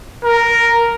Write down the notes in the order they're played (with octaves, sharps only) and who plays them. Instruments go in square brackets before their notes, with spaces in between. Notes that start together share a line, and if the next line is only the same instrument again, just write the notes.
[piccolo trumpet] A#4